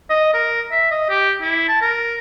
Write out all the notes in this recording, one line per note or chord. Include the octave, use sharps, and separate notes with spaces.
D#5
A#4
E5
D#5
G4
E4
A5
A#4